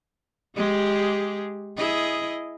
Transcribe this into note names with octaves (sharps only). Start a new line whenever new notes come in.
G#3 G4 G#4
E4 G#4 D#5